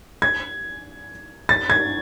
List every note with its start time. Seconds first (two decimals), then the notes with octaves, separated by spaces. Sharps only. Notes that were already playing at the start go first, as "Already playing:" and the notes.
0.22 G#6
1.49 A6
1.70 G#6